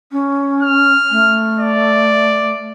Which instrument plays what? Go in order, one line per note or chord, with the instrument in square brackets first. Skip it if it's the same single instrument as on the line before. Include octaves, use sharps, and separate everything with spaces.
[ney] C#4
[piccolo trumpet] F6
[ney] A3
[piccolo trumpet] D5